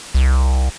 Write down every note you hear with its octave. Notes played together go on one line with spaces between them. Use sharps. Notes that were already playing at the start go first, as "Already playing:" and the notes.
C2